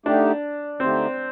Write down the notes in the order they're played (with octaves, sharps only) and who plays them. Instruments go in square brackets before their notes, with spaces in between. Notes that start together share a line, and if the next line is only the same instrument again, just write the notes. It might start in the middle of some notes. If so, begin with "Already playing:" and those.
[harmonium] D3 A3 D#4 G4 [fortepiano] D4
[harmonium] D3 A3 D#4 G4 [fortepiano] C4